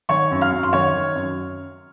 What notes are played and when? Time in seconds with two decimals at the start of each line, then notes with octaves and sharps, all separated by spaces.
0.09 D#3 C#5 C#6
0.31 F#2
0.41 F5 F6
0.52 F#2
0.63 C6
0.73 D#3 C#5 C#6
0.95 D#3
1.15 F#2